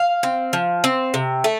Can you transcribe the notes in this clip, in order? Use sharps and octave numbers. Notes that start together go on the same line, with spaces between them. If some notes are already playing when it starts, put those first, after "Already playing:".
Already playing: F5
C4
F3
C4
C3
A3